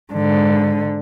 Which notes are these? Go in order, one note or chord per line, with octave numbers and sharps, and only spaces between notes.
G#2 D3